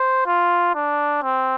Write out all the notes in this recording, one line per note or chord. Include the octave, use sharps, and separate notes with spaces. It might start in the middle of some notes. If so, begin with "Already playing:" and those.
Already playing: C5
F4
D4
C4